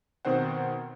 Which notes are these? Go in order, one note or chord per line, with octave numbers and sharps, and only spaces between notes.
B2 D#3 C4 C5 F#5